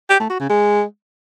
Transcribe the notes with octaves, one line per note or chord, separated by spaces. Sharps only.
G4
A3
F#4
C#3
G#3